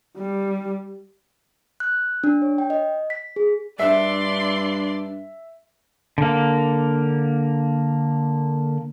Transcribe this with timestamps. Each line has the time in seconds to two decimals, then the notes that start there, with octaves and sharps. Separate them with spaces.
0.17 G3
1.80 F#6
2.24 D4
2.42 C#5
2.58 G5
2.70 D#5
3.10 B6
3.36 G#4
3.79 G2 D4 D5 E5 C6
6.18 D3 A#3